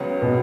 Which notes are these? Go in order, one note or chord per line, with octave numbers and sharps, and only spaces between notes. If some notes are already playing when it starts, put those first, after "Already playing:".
Already playing: C#2 C#3 F#3 B3
B2